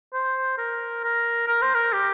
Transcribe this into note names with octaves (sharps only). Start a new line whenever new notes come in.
C5
A#4
A#4
A#4
C5
A#4
G4